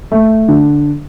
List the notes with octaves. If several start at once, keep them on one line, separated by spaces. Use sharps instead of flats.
A3
D3